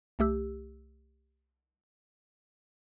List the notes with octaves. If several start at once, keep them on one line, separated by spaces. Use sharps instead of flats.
C2 A3 G4 E6